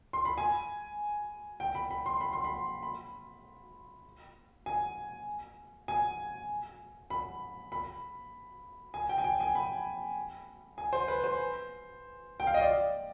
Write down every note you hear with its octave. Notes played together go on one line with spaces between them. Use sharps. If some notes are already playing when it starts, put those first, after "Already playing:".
C6
B5
G#5
G5
B5
B5
C6
B5
C6
B5
B5
G#5
G#5
B5
B5
G#5
G5
G#5
G5
G#5
B5
G#5
C5
B4
C5
G5
F5
D#5
D5